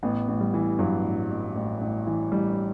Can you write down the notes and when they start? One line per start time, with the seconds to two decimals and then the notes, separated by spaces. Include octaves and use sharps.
0.03 A1 B3
0.28 A1
0.41 G3
0.54 E3
0.79 G2 F#3
1.04 A1
1.30 A1
1.55 A1
1.81 A1
2.07 E3
2.32 A1 G3